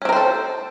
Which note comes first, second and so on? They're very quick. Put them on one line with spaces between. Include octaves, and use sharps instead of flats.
C#4 C4 A#4 C5 A4